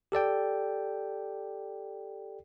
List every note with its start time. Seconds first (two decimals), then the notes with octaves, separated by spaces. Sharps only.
0.12 G4 A4 D5 G5